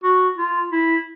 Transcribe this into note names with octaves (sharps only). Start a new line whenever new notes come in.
F#4
F4
E4